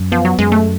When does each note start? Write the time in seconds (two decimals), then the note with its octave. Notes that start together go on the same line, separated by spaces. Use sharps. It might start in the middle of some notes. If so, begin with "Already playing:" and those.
Already playing: F#2
0.12 F3 B3
0.25 F#3
0.39 F#2 G#3
0.52 A3